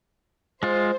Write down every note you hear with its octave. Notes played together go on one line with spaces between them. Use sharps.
G#3 F4 C5